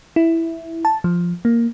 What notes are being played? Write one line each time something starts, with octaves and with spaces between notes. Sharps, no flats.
E4
A5
F3
A#3